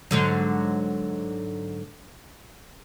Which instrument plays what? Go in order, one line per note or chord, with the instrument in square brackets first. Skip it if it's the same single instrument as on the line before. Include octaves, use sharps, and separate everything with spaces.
[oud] G#2 D3 F#3